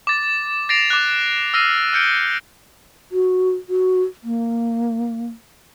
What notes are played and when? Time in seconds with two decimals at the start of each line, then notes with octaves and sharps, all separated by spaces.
0.07 D6 A6
0.69 A6 A#6 C7 D7 F7
0.90 D6 F#6
1.54 E6 F6 A#6 C7 D#7
1.93 F6 G6 C#7 D7 G7
3.12 F#4
3.69 F#4
4.24 A#3